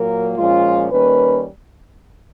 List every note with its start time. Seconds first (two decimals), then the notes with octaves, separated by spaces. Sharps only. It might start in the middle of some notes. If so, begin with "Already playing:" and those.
Already playing: A#2 F#3 A#3 A#4
0.36 A#2 F3 G#3 C#4 F4
0.91 D#3 G3 A#3 C#4 B4